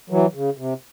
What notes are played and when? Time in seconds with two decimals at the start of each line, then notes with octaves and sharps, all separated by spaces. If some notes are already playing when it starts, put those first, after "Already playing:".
0.10 E3 F#3
0.34 C#3
0.57 C3